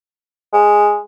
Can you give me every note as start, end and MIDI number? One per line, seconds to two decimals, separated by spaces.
0.53 0.99 56